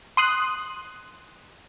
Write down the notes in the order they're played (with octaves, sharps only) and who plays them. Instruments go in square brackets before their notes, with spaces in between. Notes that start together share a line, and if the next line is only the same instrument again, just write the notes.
[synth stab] C6 D#6 F#6